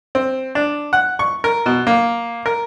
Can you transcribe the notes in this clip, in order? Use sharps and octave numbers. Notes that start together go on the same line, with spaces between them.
C4
D4
F#5
C#6
A#4
B2
A#3
A#4